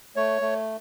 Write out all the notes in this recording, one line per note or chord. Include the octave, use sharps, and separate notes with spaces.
A3 C#5
A3